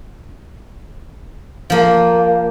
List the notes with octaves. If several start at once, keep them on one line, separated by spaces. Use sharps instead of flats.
F3 A#3